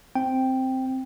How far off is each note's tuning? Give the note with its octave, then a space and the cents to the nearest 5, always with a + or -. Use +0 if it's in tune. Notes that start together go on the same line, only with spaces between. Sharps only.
C4 +0 G5 +0